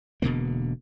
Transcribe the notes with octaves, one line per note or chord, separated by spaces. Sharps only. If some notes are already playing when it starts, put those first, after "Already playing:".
E1 B2 D3 A#3